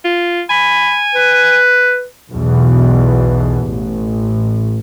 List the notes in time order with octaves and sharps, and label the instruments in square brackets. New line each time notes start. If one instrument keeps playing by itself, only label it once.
[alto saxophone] F4
[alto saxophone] G#5 [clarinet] B5
[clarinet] B4
[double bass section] B1 E2 B2
A1